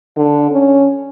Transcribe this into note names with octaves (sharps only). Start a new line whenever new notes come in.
D3
C#4